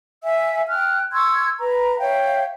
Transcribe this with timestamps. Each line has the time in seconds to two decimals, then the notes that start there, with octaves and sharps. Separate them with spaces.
0.23 E5 F5 G#5 E6
0.68 G5 F6 F#6
1.13 C6 C#6 E6 G#6
1.59 B4 A#5
1.99 C#5 E5 F5 G5